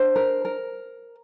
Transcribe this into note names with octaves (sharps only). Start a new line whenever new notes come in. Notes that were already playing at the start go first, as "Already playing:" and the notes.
Already playing: D4 C5
A#4
A#4